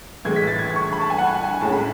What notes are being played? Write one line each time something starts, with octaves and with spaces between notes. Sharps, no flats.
A2 E3 G#3 G#6
B6
A6
G#6
C#6
B5
A5
G#5
F#5
G#5
G#5
A2 G#3 C#4 A5
B5